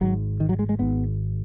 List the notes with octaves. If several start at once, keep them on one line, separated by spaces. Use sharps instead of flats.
G#1 G#2 F#3
D#3
F#3
G#3
G#3
G#1 G#2 B3